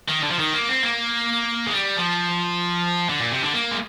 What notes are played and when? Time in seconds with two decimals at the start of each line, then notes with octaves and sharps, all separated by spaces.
0.09 D#3
0.23 D3
0.31 F3
0.39 D#3
0.54 A#3
0.69 C4
0.83 A#3
1.67 G#3
1.73 G3
1.97 F3
3.09 D3
3.20 A#2
3.32 C3
3.43 D3
3.54 A#3
3.71 G#3